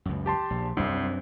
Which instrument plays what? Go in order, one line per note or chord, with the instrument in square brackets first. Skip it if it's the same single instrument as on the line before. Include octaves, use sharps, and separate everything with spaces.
[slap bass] C#2 F#2
[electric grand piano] G4 A5 C6
[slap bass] A#1
[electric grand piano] C2 [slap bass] F#2 C4 D4